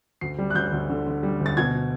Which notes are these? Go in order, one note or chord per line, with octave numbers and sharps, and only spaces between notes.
D2 C7
G3
F#6
D2 G6
D2
D3
D3
G3
D2
A6
B2 G#6